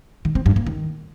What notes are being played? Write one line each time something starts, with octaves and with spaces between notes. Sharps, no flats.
D#3
C4
G2
A#3
D#3